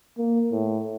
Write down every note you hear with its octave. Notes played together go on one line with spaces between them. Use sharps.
A#3
A2